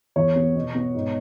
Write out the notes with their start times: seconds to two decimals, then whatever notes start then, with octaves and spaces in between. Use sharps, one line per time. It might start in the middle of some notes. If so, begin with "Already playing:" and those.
0.16 E2 C#5
0.36 B3
0.55 B2
0.75 B3
0.95 G#2